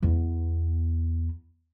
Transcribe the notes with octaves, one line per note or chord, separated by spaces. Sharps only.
E2 B3